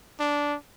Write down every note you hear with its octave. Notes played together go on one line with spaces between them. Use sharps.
D4